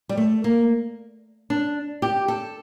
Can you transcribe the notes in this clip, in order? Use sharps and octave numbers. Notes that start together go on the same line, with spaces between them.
G3
A3
A#3
D4
G4
A4